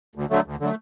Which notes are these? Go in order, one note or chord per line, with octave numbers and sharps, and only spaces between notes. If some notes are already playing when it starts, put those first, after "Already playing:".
D2
D3 F#3 A3
D2
D3 F#3 A3